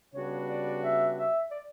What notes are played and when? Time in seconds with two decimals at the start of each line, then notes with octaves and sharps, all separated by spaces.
0.14 C#3 G3 B3 D4 F#4 C#5
0.48 D5
0.83 E5
1.17 E5
1.51 D5